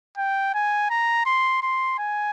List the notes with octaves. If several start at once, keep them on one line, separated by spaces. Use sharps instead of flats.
G5
G#5
A#5
C6
C6
G#5